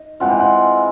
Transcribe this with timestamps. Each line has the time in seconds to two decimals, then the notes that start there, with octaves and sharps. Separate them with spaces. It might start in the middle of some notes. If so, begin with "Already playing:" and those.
Already playing: D#4
0.20 E3 G#3 C4 F4 F#5
0.30 G5
0.40 F#5